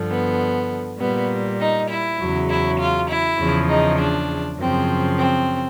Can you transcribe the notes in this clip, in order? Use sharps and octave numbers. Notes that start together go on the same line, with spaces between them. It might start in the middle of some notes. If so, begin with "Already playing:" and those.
Already playing: G2 D3 F3
B3
A#2 G3 B3
D#4
E4
E2 C#3 F#3
E4
F4
E4
E2 C#3 F3
D#4
D4
F#2 C#3 F3 C4
C4